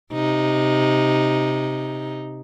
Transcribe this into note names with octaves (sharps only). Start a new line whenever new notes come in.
C3 D#4